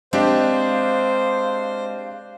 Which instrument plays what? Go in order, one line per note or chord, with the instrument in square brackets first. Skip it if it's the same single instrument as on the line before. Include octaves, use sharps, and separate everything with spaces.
[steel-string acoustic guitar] G#3 [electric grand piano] C4 D4 G4 [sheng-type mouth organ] C5 [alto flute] F5